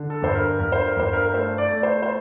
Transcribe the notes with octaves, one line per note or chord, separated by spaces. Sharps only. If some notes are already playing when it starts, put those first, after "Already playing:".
Already playing: D3
A4
G2 C5
A#4
G2 A#4
C5
A#4
G2 C5
A#4
A#4
A3 C5
D5
A3
C5
C5